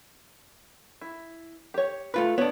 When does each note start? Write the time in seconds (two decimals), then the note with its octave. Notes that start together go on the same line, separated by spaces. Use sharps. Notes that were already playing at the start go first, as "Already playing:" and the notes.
1.01 E4
1.74 G4 C#5
2.14 A3 F4 B4
2.38 B3 D4 C#5